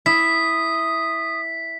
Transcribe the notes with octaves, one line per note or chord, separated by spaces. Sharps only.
E4 D#6 B6